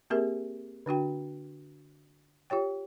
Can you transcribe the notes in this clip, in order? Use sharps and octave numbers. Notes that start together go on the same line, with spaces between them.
A#3 C4 G4 G#4 A#4 E5
D3 D4 F#4 G5
F4 G4 C#5 G5